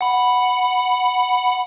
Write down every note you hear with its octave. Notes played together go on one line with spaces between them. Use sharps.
F#5 B5